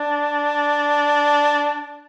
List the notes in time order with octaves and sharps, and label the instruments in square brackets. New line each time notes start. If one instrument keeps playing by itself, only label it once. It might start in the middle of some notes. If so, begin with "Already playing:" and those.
Already playing: [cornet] D4